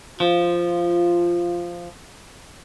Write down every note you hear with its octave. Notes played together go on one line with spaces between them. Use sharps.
F3 F4